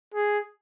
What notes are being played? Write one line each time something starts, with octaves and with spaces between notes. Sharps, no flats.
G#4